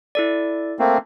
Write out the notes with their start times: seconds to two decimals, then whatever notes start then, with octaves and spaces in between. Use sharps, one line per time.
0.15 E4 A4 D5
0.79 A3 A#3 C4